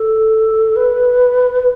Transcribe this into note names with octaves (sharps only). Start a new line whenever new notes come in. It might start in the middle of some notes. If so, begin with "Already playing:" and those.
Already playing: A4
B4